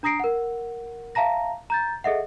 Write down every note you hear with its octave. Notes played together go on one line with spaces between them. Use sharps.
D4 A#5 D#6 A#6 C7 D7
A#4 F#5
E5 F5 A5 A#5 A#6
A#5 G6 A6
G#4 A4 D#5 E5 F#5